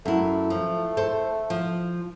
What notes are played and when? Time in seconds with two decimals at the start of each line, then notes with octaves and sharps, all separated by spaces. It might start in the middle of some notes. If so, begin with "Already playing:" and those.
0.06 F#2 A3 E4
0.50 F3
0.97 A4 C5
1.50 F3